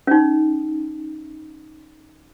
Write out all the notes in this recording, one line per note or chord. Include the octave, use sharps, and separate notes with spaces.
C#4 D#4